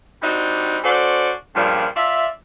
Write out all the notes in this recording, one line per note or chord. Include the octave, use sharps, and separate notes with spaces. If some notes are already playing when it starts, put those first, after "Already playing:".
G3 C4 D4 D#4 F#4
C#4 F#4 A4 C5 D5
G2 A#2 C#3 F3 G3
F4 D5 E5